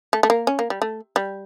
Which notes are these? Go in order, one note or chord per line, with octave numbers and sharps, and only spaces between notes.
A3
A3
A#3
C#4
A#3
G3
A3
G3